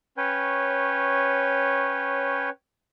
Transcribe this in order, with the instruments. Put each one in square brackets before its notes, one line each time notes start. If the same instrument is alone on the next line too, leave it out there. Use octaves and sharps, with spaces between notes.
[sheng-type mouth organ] C#4 B4 C#5 G5